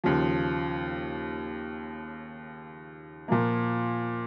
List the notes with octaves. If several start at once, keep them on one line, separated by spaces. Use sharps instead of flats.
D#2 C#3 F3
A#2 F3 A#3